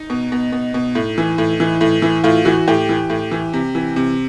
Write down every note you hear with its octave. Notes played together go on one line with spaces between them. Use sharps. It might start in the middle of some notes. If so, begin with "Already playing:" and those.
Already playing: D#4
B2
B2
B2
B2
A2
E3
A2
E3
A2
E3
A2 F4
E3 F#4
A2 G4
E3
A2
E3
C3
E3
C3